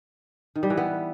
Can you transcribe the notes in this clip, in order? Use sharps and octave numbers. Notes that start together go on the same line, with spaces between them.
D#3
G3
E3
B3